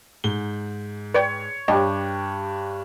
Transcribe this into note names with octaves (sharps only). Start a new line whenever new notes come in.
G#2 G7
B4 C#5 D5 G5
G2 G4 C#5 D#5 A5